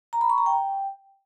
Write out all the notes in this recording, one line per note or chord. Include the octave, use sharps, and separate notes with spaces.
A#5
B5
C#6
A#5
G5